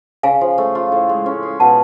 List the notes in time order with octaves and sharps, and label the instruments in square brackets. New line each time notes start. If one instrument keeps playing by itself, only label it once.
[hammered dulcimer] C#3 [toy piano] F5 G#5
[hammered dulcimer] F3
A3
F4
A2
G#3
C#4
G#4
[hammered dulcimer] B2 [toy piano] F#5 A5